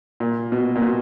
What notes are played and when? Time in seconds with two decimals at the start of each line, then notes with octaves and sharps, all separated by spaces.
0.20 A#2
0.52 B2
0.75 A#2
0.82 B2